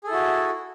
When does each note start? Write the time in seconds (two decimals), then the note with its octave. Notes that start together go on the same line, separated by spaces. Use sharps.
0.04 G#4
0.07 A4
0.10 E4
0.13 F#4